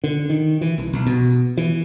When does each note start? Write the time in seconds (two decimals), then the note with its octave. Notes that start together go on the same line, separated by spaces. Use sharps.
0.04 D3
0.30 D#3
0.61 E3
0.78 C2
0.93 B1
1.06 B2
1.57 E3